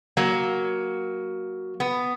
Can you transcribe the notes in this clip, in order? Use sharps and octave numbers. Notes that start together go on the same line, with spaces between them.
F#3 A#3
B3